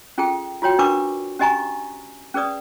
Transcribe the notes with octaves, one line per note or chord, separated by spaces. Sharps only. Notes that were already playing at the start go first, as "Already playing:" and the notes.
C#4 F4 G#4 A4 G5
F4 F#4 C#5 G5
D4 A#4 B4 C#6 D6
C#4 G4 D#5 G#5 A#5 C#6
C#4 G#4 B4 D5 D#6